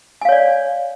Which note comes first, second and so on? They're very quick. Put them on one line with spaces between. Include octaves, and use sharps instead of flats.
G#5 F5 C#5 D5